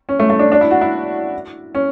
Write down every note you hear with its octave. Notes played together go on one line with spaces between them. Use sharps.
C#4
A3
A3
D4
D4
E4
F#4
E4
C#4